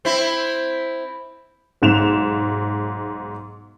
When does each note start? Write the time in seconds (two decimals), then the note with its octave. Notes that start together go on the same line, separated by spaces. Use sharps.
0.05 C4 E4
1.82 B1 G#2 E7 F7